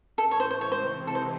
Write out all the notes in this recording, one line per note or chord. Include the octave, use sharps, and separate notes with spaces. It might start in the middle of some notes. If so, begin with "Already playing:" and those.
A2 E3 A3 A4
C#5
C5
C#3 G#3 C4 C5
C#5
C5
C3 E3 C4 D#4
A4
C5